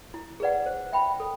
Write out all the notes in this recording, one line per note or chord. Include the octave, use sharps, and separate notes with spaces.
E4
G#4 B4 D5 F#5
C5
E5 G5 B5
A4